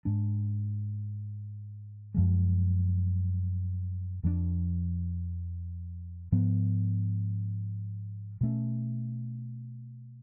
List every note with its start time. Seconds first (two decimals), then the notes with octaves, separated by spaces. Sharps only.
0.05 G#2 G#3 D4
2.14 F#2 F3 G#3
4.23 F2 F3 A3 D4
6.32 G#2 F3 B3
8.41 B2 A3 C#4